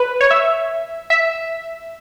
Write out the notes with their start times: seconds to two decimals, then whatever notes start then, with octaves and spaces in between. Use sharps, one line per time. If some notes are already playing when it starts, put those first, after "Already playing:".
Already playing: B4
0.21 C#5
0.30 E5
1.10 E5